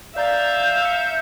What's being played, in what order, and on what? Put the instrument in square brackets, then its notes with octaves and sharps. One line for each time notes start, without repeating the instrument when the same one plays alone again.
[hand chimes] D5 A#5 A6 [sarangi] E5 [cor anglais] F5 [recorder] G6
[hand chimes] E6 C#7